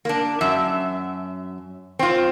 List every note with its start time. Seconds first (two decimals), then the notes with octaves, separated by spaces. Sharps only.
0.05 A#3 D4
0.41 F#2 E5
1.99 C4 F4